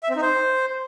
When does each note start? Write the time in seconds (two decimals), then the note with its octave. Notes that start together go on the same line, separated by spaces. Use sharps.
0.03 E5
0.09 C4
0.16 D#4
0.22 C5